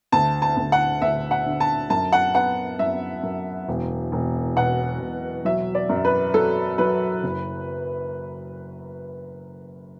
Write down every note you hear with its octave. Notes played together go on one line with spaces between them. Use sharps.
D2 A5
A5
D2
F#5
D2 E5
F#5
D3
A5
F#2 A5
F#5
B3 F#5
F#2 E5
F#2
E1
E1
B2 F#5
E1
F#3 E5
D5
F#2
B4
F#3 A4
F#3 B4
F#1